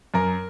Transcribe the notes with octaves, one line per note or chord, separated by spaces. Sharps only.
F#2 A#4